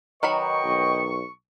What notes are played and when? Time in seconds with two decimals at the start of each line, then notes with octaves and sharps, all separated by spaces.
0.23 D#3 F#3 B4 D#5 G5 B5 C#6
0.64 B1